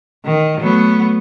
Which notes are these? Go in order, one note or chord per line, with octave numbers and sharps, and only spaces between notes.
D#3
F#3 A3 B3